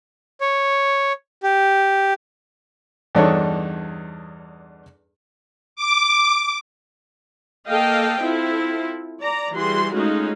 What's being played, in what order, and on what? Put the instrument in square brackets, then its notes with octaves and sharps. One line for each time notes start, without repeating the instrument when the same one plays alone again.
[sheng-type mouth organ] C#5
G4
[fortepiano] E2 G2 D4 D#4 A4 C#5
[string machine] D6
[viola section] A#3 A4 D#5 F5 G5
C4 E4 F4 A4
D5 A#5
E3 G3 F#4 G#4 C6
G#3 A3 C#4 D#4 F4 F#4